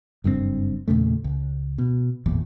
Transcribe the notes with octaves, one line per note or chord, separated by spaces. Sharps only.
F#1 G2 C#3 C4
E2 A#2 C#3 A3
C#2
B2
G#1 E2 A#2